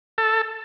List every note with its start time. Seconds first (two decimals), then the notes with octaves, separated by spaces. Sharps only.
0.18 A4